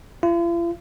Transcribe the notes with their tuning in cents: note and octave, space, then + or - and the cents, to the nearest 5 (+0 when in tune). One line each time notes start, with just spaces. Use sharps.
F4 -45